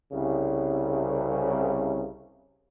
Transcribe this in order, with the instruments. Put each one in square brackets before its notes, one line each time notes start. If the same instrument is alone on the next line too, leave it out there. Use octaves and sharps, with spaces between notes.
[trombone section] C2 C#3